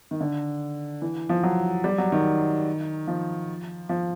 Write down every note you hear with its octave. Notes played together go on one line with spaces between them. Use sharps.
D#3
D3
E3
F3
F#3
G3
F#3
D#3
F3
F3